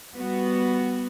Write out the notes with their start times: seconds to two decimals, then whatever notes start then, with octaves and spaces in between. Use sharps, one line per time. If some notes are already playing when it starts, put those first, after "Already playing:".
0.16 G3 B3 F#4